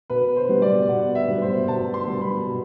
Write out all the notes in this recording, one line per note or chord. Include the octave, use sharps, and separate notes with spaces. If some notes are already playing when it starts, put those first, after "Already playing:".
B2 B4
C5
G3 B3
D5
B2 F#5
E5
G3 B3
C5
B2 A5
C6
G3 B3
B5
B2